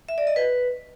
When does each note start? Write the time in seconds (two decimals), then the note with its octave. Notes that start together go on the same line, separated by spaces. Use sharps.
0.09 E5
0.18 D5
0.27 D#5
0.36 B4